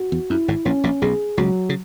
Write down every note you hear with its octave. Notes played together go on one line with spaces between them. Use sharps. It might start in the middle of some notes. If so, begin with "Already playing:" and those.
Already playing: F#4
E2
F#2 E4
G#1 G#2
A#1 A#2 C#4
A#1 A#2
B1 B2 G#4
C#2 C#3 F#3
C#3